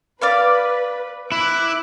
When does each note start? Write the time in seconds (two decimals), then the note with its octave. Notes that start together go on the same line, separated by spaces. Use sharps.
0.22 B4 D5 F5 B5
1.32 E4 D6 F#6